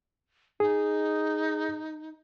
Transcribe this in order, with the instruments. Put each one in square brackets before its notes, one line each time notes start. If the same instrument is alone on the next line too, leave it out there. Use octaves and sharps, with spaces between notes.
[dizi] D#4 [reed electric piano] G#4